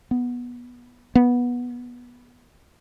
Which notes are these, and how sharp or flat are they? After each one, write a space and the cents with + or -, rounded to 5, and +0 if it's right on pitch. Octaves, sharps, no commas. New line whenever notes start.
B3 -15
B3 -15